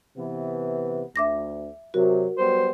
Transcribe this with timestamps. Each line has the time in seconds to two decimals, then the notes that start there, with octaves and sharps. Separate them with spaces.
0.17 C3 E3 B3
1.16 D2 E5 D6 A#6
1.94 C3 F#3 F#4 A#4
2.38 F#3 G3 B3 C5